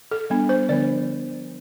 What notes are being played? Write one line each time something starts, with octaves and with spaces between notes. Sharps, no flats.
A4
G3 B3 D4
C5
D3 F3 B3 D4 D5